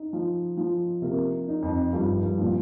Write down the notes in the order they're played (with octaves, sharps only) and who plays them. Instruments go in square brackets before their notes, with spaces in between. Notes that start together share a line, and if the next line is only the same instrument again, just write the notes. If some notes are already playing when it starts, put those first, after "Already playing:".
Already playing: [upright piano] D#4
F3
F3
[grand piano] C3 [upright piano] A#3
[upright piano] D#4
[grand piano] F2
[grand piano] G2 [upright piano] F3
[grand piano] G2
[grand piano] A#2 [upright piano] F3